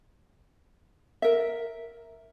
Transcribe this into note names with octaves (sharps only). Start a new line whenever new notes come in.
A#4 E5